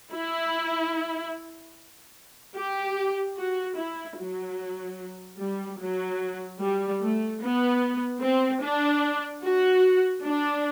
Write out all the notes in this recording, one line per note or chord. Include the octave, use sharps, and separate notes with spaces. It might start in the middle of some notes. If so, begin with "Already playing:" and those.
E4
G4
F#4
E4
F#3
G3
F#3
G3
A3
B3
C4
D4
F#4
D4